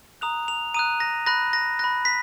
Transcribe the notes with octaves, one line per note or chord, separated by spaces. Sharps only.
A#5 D#6 F#6 F7
F7
A#5 D#6 F#6 D#7
A#6
B5 F#6 A#6
A#6
B5 F#6 A#6
B6